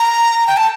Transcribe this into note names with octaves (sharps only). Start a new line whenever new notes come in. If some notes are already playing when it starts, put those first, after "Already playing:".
Already playing: A#5
G5
A5